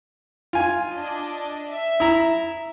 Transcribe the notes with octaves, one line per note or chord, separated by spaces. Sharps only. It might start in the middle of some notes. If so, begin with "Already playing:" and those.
F4 G#5
D4 D#5
E5
E4 A#5